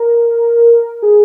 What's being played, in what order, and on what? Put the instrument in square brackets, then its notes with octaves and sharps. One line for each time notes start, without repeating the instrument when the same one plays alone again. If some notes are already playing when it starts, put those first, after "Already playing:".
Already playing: [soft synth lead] A#4
G#4